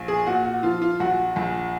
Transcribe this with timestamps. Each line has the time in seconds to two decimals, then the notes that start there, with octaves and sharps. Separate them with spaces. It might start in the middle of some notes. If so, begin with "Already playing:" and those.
Already playing: A#1
0.08 G#4
0.26 A#2 F#4
0.44 F#4
0.63 F3 F4
0.82 F4
1.00 A#1 F#4
1.36 A#1